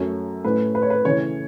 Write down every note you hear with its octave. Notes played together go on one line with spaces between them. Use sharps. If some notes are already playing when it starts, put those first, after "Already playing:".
Already playing: F#2 F#3 A3 C#4
A2 A3 C#4 B4
B4
C#5
B4
C#3 E3 A3 C#4 C#5